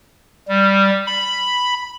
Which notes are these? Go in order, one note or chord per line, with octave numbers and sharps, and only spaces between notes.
G3
B5